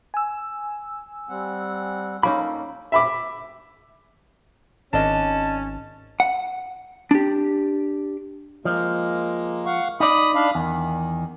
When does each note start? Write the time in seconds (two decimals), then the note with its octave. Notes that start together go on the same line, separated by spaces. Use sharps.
0.14 G#5 E6
1.29 G3 C4 F#5
2.23 A#3 C#4 D#4 A4 B5
2.92 E5 B5 D6
4.93 G#1 C#4 D4 D#5 A5
6.20 F#5
7.11 D4 G4
8.65 F3 G#3 A#3
9.66 F5 F#5 C#6
10.00 D#4 D5 B5 D#6
10.35 D4 F5 B5
10.55 E2 D#3